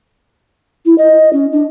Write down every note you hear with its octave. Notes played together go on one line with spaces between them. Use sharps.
E4
D#5
C#4
D4